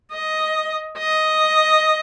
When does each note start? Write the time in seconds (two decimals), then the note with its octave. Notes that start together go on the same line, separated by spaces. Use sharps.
0.13 D#5
0.98 D#5